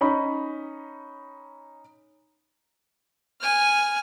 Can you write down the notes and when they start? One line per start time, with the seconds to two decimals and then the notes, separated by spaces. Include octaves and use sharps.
0.01 C#4 D#4 B5
3.41 G#5 F6